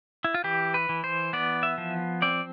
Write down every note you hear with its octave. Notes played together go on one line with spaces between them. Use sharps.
E4
F4
E3 G4
B4
E3
C5
B3 D5
E5
F3
C4 D5